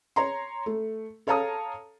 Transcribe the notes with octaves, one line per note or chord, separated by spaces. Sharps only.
C#5 A#5 C6
A3
A4 C#5 F5 A5 A#5 D#6